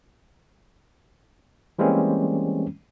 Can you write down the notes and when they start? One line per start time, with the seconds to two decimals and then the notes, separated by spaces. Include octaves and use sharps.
1.79 E3 G3 G#3 A#3 C4 C#4